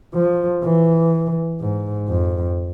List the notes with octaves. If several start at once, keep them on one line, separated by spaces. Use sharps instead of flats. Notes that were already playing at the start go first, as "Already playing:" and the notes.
F3
E3
G#2
F2